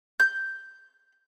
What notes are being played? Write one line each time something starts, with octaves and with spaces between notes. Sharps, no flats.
G6